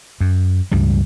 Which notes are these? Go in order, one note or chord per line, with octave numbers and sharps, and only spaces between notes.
F#2
C#2 G2 G3